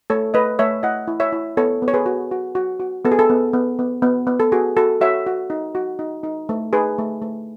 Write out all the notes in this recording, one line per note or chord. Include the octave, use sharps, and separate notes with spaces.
A3 A4 C#5
A3 B4 D#5
A3 C#5 E5
E4 D#5 F#5
E4
C#5 E5
E4
B3 A4 C#5
B3
C#5
G#4 B4
F#4
F#4
F#4
F#4
B3 A4
G#4
A4
B3
B3
B3
B3
B3
A4
F#4 G#4
F#4 A4
F#4 C#5 E5
F#4
D#4
F#4
D#4
D#4
A3
D#4 G#4 B4
A3
A3